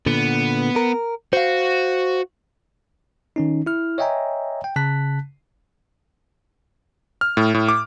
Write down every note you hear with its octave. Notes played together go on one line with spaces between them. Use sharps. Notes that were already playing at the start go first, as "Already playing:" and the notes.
A#2 D3 B3
A#4
F#4 C5 F5
D#3 C#4 D#4
E4 F6
C#5 D#5 E5 G5 G#5 A#5
G5
C#3 A5 F#6 B6
F6
A2
A2
D6